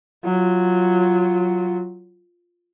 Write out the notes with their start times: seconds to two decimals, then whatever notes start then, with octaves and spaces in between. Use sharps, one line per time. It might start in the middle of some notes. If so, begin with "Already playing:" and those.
0.24 F#3 F4